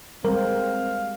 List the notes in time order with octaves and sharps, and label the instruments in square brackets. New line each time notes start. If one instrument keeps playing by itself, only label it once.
[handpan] G3 G#3 C5 [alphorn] C4 [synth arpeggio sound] A#4 [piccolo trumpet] F5